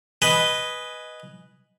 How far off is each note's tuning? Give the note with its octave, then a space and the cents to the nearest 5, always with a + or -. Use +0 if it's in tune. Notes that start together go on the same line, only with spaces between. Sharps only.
B4 +0 D#5 +0 G#5 +0